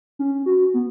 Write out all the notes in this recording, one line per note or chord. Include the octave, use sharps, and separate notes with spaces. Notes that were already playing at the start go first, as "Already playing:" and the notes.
C#4
F#4
B3